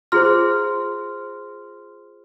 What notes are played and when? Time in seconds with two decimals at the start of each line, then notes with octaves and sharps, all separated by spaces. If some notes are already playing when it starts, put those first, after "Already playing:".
0.12 F4 G#4 C5 C6 F6